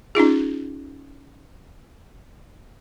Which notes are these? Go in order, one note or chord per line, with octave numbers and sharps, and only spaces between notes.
C#4 D#4 F4 G#4